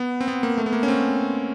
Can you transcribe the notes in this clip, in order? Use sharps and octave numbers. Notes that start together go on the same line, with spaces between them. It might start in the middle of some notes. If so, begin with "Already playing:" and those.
Already playing: B3
C4
B3
A#3
A3
B3
A#3
C#4
C4